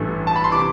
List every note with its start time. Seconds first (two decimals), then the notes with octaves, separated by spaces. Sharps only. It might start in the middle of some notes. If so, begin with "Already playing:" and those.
Already playing: A1 G2 E3 A3
0.27 A5
0.36 B5
0.44 C6
0.52 C3 E3 D6